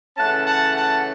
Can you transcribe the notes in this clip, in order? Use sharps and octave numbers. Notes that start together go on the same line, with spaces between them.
C#3 E3 A3 C#4 F#5 A5
F#5 A5
F#5 A5